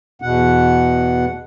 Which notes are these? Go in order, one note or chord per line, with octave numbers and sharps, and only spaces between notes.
E2 B2 F#5